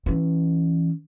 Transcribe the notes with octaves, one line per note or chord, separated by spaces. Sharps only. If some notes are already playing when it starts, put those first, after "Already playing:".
E3 C#4